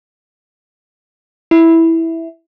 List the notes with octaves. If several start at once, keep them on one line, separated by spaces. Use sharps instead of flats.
E4